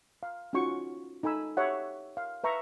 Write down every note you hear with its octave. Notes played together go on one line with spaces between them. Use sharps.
F5
C#4 D#4 F4 F#4 C#6
D#4 A4 G#5 B5 E6
G4 C#5 E5 F#5
F5
B4 E5 A#5 C#6